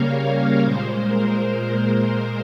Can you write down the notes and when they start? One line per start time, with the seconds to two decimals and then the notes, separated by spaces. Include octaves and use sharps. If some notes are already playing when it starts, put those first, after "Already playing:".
Already playing: C#3 G3 A#3 A#4 C#5 F5
0.24 C#5
0.63 A#2 G#3 C5
1.02 A#4